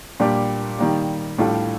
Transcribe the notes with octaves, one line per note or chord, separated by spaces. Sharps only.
A#2 G3 D4 G4
D#3 G3 A#3
A2 G3 D4 F4 A4